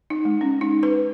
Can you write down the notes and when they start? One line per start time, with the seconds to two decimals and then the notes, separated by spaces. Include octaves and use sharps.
0.10 D#4
0.25 G#3
0.41 C#4
0.61 D#4
0.83 B4